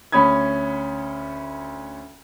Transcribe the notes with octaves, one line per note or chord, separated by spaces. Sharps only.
D2 C#4 B5 D#6 G#6